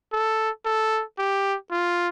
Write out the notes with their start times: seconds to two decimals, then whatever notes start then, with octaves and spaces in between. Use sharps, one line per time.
0.12 A4
0.65 A4
1.18 G4
1.71 F4